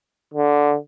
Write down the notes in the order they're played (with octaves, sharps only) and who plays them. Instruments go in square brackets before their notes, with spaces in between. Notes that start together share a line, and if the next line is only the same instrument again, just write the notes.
[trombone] D3